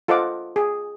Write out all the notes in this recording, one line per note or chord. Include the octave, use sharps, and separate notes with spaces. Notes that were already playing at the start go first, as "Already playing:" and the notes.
F4 A4 C5 D#5 F#5 D6
G#4